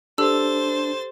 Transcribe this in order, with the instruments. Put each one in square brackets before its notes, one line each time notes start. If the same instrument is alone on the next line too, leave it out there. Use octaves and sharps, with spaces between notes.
[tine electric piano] D4 [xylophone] G4 A4 E6 [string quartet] C5 A6